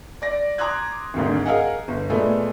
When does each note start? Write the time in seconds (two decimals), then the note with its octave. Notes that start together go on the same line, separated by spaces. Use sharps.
0.22 D5 A#6
0.58 A#5 C6 D6 D#6 F#6 G#6
1.14 G#1 D2 G#2
1.46 G#4 A#4 D#5 F5 F#5
1.88 G1
2.10 A#2 G#3 A3 B3